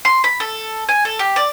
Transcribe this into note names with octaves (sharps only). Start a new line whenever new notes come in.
C6
B5
A4
G#5
A4
G4
D5